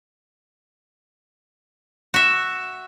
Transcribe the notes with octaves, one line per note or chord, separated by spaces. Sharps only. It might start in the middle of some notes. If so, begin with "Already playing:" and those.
F#4 E5